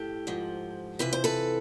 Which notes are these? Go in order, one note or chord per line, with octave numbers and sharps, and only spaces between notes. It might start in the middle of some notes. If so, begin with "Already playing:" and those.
Already playing: A2 G4 A4
G#2 F3
F2 C3 E3 B4
C5
A4 B4